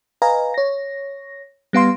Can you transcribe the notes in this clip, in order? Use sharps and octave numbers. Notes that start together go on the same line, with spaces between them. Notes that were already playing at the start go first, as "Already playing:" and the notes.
B4 D#5 F5 G#5 A#5
C#5 A#6
G3 B3 F5 C6